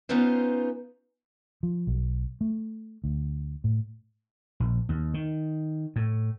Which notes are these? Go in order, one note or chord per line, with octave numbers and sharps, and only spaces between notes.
B3 C#4 D#4 F4 B4 C5
F3
B1
A3
D2
A2
A#1
D#2
D#3
A2